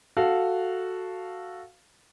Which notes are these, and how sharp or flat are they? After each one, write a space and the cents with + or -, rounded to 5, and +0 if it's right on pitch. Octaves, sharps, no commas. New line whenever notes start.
F#4 +0 A4 +0 F5 -5